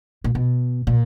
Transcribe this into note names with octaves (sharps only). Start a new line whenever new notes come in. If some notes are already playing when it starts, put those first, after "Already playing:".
A#2
B2
A#2